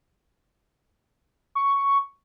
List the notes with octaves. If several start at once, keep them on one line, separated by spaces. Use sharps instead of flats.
C#6